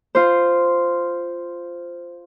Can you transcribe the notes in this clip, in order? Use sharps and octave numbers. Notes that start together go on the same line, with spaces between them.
F4 C5